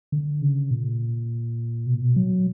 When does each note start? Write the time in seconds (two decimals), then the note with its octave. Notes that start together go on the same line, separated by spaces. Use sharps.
0.12 D3
0.42 C#3
0.71 A#2
1.86 B2
1.94 A#2
2.01 B2
2.16 F#3